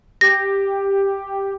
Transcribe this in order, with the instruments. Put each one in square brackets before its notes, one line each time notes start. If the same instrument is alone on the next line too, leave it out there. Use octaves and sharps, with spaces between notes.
[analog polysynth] G4 [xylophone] A#6